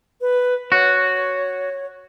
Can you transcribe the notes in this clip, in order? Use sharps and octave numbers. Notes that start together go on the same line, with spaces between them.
B4
F#4 C#5